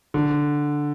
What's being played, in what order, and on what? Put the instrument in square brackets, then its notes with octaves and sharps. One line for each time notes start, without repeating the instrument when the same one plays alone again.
[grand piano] D3